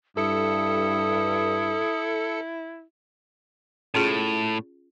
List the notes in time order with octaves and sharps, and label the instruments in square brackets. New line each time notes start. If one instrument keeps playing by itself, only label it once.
[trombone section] G2 [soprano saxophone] E4 [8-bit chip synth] A4 C#7 [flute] D#6
[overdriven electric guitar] A2 [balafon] C#4 F4 G#4